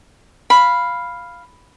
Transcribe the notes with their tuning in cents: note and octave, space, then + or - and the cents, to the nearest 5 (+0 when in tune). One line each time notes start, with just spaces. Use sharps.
F5 +0 B5 +0